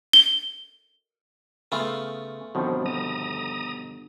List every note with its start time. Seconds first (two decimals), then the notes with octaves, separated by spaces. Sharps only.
0.13 G7
1.72 C#3 A3 B3 F4
2.55 G1 B2 D#3 F3 F#3 C4
2.86 A#5 D#6